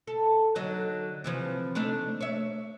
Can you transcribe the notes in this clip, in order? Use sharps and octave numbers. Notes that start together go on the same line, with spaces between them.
A4
D3 F#3 D#4
C3 E3 F3
A3 D4 D#4
C#5 E5